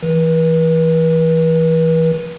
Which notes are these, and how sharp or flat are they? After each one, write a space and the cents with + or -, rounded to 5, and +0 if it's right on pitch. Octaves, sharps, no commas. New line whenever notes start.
E3 +0 B4 -40